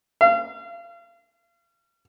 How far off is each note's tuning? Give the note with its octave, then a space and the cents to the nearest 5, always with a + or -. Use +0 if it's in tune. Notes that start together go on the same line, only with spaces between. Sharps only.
F5 -35